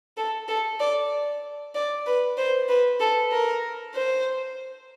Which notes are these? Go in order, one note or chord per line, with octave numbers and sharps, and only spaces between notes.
A4
A4
D5
D5
B4
C5
B4
A4
A#4
C5